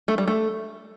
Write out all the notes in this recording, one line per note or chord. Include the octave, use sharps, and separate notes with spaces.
A3
G3
A3